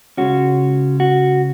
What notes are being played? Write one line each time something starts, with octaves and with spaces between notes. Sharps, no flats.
C#2 C#3 G#3 C#4 F#4
F#4